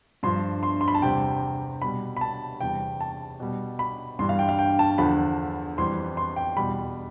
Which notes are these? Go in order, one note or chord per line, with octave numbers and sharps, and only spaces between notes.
G2 F3 C6
C6
C6
B5
A5
E2 C3 G3 G5
B2 G3 B5
B5
A5
E2 C3 E3 G3 G5
A5
B2 G3
B5
G2 E3 G3 C6
F5
G5
F5
G5
A5
E2 D3 F3 B5
F2 E3 G3 C6
C6
G5
E2 B2 G3 B5